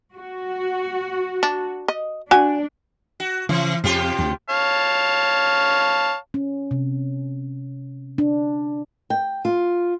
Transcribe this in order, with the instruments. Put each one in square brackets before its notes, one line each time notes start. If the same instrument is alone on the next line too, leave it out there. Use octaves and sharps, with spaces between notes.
[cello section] F#4
[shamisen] D4
D#5
[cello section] D4 [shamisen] F#4 G#5
[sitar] F#4
[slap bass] C#3 [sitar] E3
[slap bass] F2 [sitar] C3 F4 G4
[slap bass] D2
[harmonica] C#5 F5 A5
[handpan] C#4
C3
D4
[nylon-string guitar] G5
F4